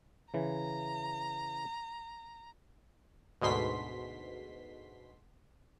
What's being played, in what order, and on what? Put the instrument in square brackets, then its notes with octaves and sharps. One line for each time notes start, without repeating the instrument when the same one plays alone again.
[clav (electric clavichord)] C#3 E3 [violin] A#5
[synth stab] D2 G#2 B2 C6 B6